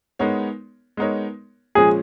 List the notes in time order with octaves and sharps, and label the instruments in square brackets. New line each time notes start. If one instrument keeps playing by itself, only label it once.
[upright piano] G#3 B3 D#4 A#4 C#5
G#3 B3 D#4 A#4 C#5
[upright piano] A#2 F3 G#3 C#4 [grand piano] G#4